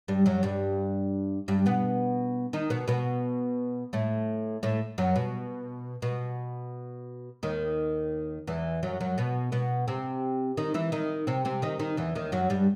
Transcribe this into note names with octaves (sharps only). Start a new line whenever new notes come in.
G2 G3
F#2 F#3
G2 G3
G2 G3
B2 B3
D#3 D#4
B2 B3
B2 B3
A2 A3
A2 A3
F#2 F#3
B2
B2
D#2 D#3
E2 E3
F#2 F#3
F#2 F#3
B2 B3
B2 B3
C3 C4
D#3 D#4
E3 E4
D#3 D#4
C3 C4
C3 C4
D#3 D#4
D#3 D#4
E2 E3
D#2 D#3
F#2 F#3
G2 G3